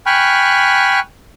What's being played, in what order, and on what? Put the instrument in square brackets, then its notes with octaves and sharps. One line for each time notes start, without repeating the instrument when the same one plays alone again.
[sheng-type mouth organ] G5 G#5 B5 C#6 F6 F#6